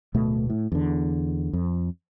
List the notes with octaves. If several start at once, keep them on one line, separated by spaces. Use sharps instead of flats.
D1 B2 A3 B3
A2
E2 D3
F2